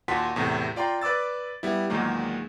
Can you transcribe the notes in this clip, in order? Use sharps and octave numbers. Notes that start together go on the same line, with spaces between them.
D#2 A#2 F#4 A5 C6 B6
E2 A2 C3
F4 D5 G5 A#5 C6
B4 D5 D6 E6 A6
G3 B3 E4
E2 A#2 D#3 F#3 G#3 A#3